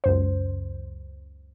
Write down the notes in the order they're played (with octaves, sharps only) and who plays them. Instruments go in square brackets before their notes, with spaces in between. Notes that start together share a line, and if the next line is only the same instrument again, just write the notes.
[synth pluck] C#2 F#2 C5